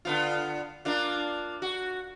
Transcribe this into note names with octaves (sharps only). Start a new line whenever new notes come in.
D3 B3 F4
A#3 D4 F4
F#4